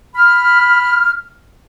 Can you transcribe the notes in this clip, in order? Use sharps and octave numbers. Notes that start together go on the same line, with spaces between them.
B5 F6